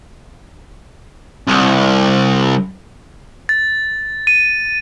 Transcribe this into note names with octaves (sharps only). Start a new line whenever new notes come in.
C2
A6
D#7